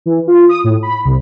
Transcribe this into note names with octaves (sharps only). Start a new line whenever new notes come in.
E3
F4
D#6
A2
B5
C2